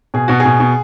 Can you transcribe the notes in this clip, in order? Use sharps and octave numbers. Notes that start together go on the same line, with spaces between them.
B2 G#4
B2 F#4
G#4
B2
B2